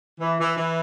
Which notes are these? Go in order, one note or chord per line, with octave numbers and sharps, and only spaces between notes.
E3
E3
E3